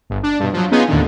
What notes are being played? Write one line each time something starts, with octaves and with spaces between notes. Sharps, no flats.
G1
D4
G2 B2
F3 F#3
B3 C#4 D#4 F4 G#4
D#2 A2 D3 D#3